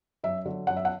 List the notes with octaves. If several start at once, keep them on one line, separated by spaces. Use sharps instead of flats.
F#2 E5
D3 F#3
F#2 F#5
E5
F#5